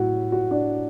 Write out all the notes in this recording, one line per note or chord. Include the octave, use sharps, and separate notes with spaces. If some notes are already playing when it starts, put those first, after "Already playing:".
Already playing: A2 F#3 E4 F#4
F#4
D4